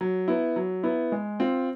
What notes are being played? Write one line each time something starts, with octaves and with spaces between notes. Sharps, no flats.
F#3
B3 E4
F#3
B3 E4
G#3
C4 F4